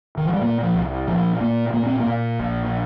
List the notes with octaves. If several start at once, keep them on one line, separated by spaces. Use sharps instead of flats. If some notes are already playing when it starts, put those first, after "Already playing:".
D#3
F3
G3
A#2 A#3
F3
C2
A#2 F3
A#2 A#3
A#2 A#3
C4
A#3
A#2
A#1